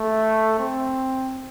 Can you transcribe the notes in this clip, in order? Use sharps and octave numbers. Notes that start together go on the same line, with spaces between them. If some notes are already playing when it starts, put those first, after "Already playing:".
Already playing: A3
C4